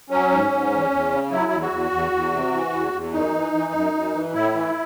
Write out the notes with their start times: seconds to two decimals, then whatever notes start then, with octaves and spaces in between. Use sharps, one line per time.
0.10 F#3 C#4
0.30 G#2
0.51 G#2
0.71 E2
0.91 E2
1.11 C#3
1.31 F#3 E4
1.51 E2
1.61 F#4
1.71 E2
1.91 E2
2.12 E2
2.32 C3
2.52 E3
2.72 E2
2.92 E2
3.13 F#2 D#4
3.32 E3
3.53 E3
3.73 F#2
3.93 F#2
4.13 E3
4.33 A2 E4
4.53 E3